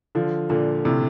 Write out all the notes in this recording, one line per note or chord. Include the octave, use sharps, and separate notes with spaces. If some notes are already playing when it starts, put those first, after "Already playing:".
D3 F3
A#2 D3
A2 C3